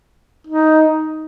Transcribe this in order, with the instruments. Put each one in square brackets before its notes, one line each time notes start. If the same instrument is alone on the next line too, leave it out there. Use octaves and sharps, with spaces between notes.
[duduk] D#4